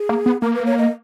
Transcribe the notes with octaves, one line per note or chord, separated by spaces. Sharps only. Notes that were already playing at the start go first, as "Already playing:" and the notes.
Already playing: G#4
A#3
B3
A#3 A#4
B4
C#5
D#5